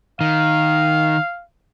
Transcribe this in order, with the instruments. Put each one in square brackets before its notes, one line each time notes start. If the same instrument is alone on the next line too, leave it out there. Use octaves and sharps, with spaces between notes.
[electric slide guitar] D#3 [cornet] F5